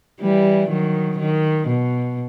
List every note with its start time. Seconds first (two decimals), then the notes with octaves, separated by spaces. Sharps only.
0.21 E3 G3
0.69 D#3 F#3
1.19 D#3
1.68 B2